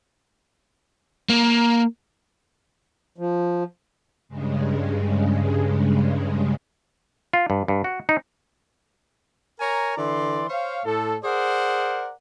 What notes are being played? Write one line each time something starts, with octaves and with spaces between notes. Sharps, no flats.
A#3
F3
G2 C#3 G#3
F4
G2
G2
F#4
D#4
A#4 C#5 G#5 A#5
D3 E3 D5 C6
C5 C#5 F5
A2 A4
G#4 A#4 C5 D5 F#5